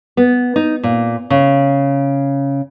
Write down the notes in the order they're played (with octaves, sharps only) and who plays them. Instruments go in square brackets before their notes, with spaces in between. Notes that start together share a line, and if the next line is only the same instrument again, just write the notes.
[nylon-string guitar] B3
D#4
A#2
C#3